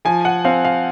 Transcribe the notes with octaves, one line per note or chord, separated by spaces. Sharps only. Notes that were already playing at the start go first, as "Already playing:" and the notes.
F3 G#5
F#5
C4 F5
F5